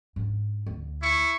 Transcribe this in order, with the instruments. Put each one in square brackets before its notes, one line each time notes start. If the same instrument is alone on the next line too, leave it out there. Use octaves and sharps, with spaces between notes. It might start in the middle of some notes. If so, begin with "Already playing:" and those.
[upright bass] G#2 D4
D2
[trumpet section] E4 C#6